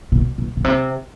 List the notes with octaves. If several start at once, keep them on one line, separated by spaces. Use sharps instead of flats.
B2
B2
B2
C3